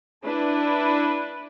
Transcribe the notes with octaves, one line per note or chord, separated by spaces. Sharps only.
D4 E4 B4